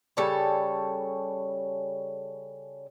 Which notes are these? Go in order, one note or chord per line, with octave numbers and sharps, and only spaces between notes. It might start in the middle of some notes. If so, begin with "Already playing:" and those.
C#3 G3 A4 C#5